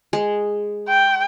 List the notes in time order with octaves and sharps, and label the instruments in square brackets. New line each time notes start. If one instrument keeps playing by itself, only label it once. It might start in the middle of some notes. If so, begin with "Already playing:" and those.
[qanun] G#3
[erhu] G5